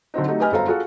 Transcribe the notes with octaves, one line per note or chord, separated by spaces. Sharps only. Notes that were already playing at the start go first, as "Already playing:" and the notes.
D3 F#3 C4 D#4
F#3 A3 D#4 G4
G4 B4 D#5 G#5 F6
G1 F#2 A4 C5 F5 A#5
F4 F#4 G#4 A4 F5 F#5